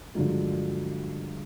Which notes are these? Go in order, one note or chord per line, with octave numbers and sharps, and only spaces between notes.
G2 D3 F3 F#3 G#3